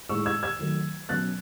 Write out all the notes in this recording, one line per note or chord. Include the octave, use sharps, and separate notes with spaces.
A2 G#3 D#4 C#6 E6
E6 G#6
E6 G#6
D#3 F#3 A3 D#4
B2 F#3 C#4 F#6 A6